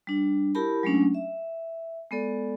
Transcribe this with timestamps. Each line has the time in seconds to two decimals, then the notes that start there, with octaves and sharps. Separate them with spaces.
0.07 G3 D4
0.55 E4 G4 A#4 A5 B5
0.83 F#3 G#3 A3 C#4 D4
1.14 E5
2.11 G#3 B3 A4 D5